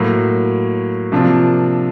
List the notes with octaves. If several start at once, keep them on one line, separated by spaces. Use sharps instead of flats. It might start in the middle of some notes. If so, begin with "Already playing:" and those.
Already playing: A2 F#3 A#3
C3 F3 A#3 D4 F4